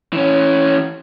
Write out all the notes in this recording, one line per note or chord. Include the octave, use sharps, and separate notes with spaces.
E3 C#4